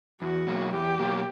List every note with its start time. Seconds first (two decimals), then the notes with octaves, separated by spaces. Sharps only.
0.22 E2 F#4
0.47 B2 F#3 A#3
0.73 E2 G4
0.99 B2 F#3 A#3